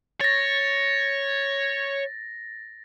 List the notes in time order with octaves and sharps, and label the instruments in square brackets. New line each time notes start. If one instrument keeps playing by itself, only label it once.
[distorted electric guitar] C#5 [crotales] A6 A#6